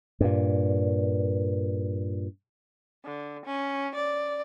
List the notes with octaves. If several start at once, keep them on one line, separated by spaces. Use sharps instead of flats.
G2 A#2
D3
C#4
D5